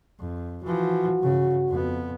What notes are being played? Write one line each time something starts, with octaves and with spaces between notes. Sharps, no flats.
F2
E3 F3 F#4
G2 C#3
F2 B3